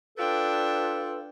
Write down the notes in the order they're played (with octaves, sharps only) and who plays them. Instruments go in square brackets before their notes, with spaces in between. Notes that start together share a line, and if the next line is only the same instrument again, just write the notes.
[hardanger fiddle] D4 G5 [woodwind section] F4 A4 B4